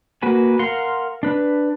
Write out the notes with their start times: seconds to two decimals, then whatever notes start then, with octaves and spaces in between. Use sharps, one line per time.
0.22 A#3 F#4 B4 G#5
0.59 A#4 F5 F#5 C6
1.23 D4 B4